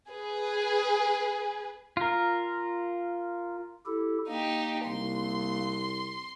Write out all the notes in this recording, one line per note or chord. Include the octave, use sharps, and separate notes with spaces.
G#4 B4
F4 A#4
E4 G4 A4
A#3 D#4 G4
C2 C6